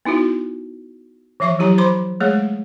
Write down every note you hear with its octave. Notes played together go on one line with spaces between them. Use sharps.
B3 D#4 E4 F#4
E3 F3 E5 C#6 D6
F#3 E4 G4 C#5 A#5
C5 B5 C6 D6
G#3 A3 G#4 C#5